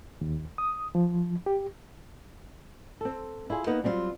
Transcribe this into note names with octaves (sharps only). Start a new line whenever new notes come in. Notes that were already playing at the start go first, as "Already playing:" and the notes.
D#2
D#6
F3
G4
C4 A4
E4 F4 G#4
A#3 B3 D#4 B4
F#3 G3 C4 D#4 F4